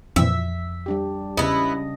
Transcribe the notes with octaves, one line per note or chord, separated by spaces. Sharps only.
F2 A#2 E3 C4 E5
G3 D4 G4
E2 C#3 B3 E4 D#5